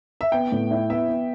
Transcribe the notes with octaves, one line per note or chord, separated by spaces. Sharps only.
E5
B3 G5
A2
E4
B3 E5
B3